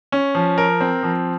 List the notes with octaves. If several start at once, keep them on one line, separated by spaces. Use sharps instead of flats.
C#4
F3
A#4
C4
F3